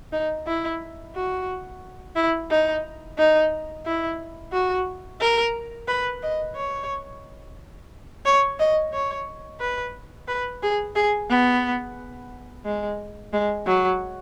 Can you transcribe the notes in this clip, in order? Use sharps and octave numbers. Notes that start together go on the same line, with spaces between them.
D#4
E4
F#4
E4
D#4
D#4
E4
F#4
A#4
B4
D#5
C#5
C#5
D#5
C#5
B4
B4
G#4
G#4
B3
G#3
G#3
F#3